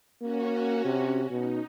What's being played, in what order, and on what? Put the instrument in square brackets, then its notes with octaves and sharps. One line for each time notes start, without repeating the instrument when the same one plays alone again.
[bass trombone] A#3 [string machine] C#4 F#4
[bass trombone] C3
[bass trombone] B2 [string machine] D#4